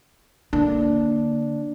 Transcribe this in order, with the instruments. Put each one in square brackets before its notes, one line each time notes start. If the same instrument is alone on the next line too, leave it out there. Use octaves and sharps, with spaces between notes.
[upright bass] D3 A#3 [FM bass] D4